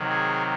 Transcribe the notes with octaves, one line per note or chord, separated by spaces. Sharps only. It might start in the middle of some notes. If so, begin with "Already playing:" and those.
Already playing: C3 D#3 F#3
G#4